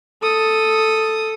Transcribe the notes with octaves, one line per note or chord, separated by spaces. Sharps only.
A4 D#6